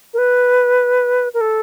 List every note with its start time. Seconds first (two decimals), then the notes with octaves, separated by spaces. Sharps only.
0.14 A#4
0.18 B4
1.34 A#4
1.41 A4